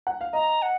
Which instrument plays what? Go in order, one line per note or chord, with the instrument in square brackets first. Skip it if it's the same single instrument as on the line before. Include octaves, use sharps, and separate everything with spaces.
[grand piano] F#5
F5
[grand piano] D#5 [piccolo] A#5
[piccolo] F#5